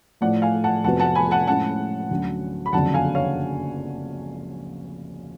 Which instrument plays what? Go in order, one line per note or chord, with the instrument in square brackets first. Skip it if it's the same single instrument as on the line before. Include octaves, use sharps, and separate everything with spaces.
[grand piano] A2 F3 A3 [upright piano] D5 F#5
[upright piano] F5 G#5
F#5 A5
[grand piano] F1 F2 F3 B3 F#4 [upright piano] F#5 A5
[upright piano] F#5 A5
G#5 B5
F#5 A5
[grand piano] A2 F3 G#3 C#4 [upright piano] F#5 A5
[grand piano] D2 D3 F#3 C#4
[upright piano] B5
[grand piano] F#1 F2 D3 F#3 [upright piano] F#5 A5
[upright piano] F5 G#5
C#5 F5